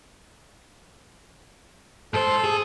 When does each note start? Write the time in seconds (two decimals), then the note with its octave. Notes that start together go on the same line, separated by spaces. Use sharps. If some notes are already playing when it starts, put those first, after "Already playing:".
2.14 G#2 A4 C5
2.44 G#4